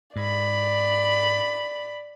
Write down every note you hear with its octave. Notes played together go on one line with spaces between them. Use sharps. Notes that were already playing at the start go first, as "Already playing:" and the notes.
G#2 D5 B5